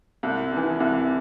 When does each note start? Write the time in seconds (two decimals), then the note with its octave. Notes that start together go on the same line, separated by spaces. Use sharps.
0.23 C2
0.52 C3 E3
0.80 C2